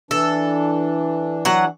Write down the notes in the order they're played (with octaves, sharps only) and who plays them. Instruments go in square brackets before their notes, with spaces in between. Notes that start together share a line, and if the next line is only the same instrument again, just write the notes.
[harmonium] E3 D4 [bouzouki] A4
[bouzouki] F#3 F#5